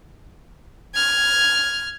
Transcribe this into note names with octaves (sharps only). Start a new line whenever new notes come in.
F6 G#6